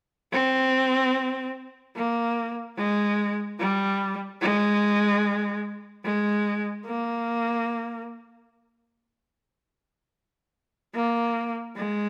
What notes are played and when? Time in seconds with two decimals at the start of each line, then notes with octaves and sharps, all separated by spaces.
0.33 C4
1.97 A#3
2.78 G#3
3.60 G3
4.42 G#3
6.05 G#3
6.86 A#3
10.95 A#3
11.77 G#3